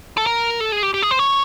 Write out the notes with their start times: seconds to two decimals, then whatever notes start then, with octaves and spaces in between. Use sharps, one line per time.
0.17 A4
0.26 A#4
0.60 A4
0.72 G#4
0.83 G4
0.94 G4
1.02 G#4
1.11 C5
1.19 C#5